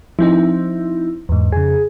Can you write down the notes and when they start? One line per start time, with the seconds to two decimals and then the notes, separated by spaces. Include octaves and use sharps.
0.19 F3 C4 D#4 E4
1.29 E2 G#2
1.52 F2 C#3 G#4